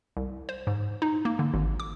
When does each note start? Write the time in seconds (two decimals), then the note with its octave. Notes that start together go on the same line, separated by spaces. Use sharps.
0.17 C2
0.49 C5
0.67 G#2
1.02 D#4
1.25 A#3
1.39 D3
1.54 G#1
1.80 D6